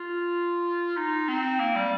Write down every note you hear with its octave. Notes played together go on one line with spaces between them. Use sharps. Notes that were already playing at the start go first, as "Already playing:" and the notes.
Already playing: F4
D#4
C4
A#3
G3